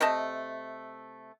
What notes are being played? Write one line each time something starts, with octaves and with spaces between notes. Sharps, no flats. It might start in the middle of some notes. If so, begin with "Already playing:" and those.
C3 A3 D#5 A5